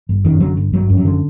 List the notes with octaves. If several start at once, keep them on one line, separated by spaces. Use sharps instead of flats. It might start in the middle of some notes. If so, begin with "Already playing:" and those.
G1
F#2 D#3
D3 F#3
G1
G1 F#3
F#2
F#3
D3